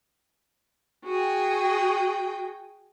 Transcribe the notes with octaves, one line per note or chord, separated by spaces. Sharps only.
F#4 G#4 G5